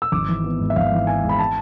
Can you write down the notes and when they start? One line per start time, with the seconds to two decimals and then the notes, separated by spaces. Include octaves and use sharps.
0.02 E6
0.12 G#1 D6
0.29 E3
0.44 B3
0.60 G#2
0.70 E5
0.76 G#1 F5
0.92 E3
1.07 B3 G#5
1.24 G#2
1.29 B5
1.39 A5